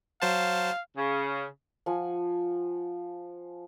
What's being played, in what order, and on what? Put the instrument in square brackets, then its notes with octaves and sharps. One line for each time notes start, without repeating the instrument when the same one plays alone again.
[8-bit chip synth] F#3 C5 A5 [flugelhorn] F5
[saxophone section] C#3
[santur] F3 F#5 G#5